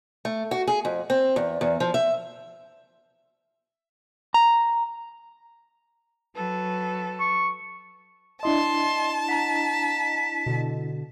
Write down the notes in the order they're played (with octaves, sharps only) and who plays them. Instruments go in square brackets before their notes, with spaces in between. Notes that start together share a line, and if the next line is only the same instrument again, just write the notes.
[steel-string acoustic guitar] A3
F#4
G#4
F2
C4
E2
E2
F3
E5
[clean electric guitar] A#5
[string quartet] F#3 A4 B4
[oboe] C#6
[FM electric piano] D4 E4 D#5 [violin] A5 [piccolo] C6
[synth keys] F#5 A#5 [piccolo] B6
[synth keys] B2 D3